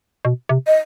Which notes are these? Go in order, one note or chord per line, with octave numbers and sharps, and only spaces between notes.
B2
C3
D#5